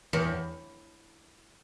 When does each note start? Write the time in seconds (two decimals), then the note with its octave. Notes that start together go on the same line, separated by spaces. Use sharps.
0.13 E2